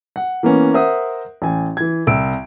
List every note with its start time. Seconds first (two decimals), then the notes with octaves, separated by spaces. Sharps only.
0.16 F#5
0.43 E3 A#3 B3 C#4
0.74 A#4 C5 E5 F#5 D#6
1.42 A1 G#5
1.77 E3 G#6
2.07 C2 E6 D7